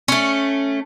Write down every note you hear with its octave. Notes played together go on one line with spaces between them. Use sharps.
A3 C#4